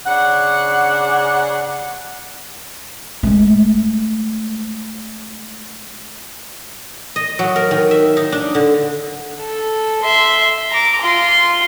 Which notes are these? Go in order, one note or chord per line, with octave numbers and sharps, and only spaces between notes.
C#3 D4 F#5
G#3 A3
D#5
F#3
A#4
D#3
E5
D#4
D4
D3
A4
E5 C6
A#5 D6
F4 C6